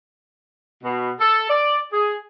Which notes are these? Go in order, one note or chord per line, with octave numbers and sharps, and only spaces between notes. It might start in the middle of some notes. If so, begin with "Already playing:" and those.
B2
A4
D5
G#4